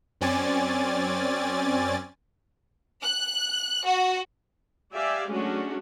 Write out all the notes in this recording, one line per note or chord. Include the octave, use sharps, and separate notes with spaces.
F#2 C4 C#4 D5 G#5 A6
F#6
F#4
G4 D5 E5 F5 G#5
F#3 G#3 A3 C#4 D4 F#4